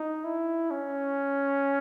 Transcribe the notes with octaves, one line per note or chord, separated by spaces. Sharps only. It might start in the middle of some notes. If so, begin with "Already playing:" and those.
Already playing: D#4
E4
C#4